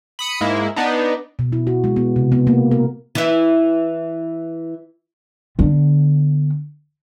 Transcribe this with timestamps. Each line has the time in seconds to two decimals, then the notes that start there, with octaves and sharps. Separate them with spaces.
0.19 B5 D#6 C#7
0.41 G#2 G#3 A#3 E4
0.76 B3 D4 D#4
1.39 B2
1.52 E4
1.67 F#4
1.84 G#3
1.96 B3
2.16 C3
2.32 B3
2.47 A#3
2.71 A#4
3.15 E3 E4
5.59 D3 B3